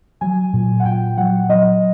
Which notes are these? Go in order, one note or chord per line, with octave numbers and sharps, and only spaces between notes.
F#3 G#5
A#2
F#5
A#2 G5
F#3 F#5
F#3 D#5